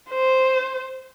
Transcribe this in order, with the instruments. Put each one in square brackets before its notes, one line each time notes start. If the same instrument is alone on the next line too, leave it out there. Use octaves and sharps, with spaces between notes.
[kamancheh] C5